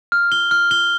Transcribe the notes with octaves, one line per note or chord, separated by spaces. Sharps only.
F6
G7
F6
G7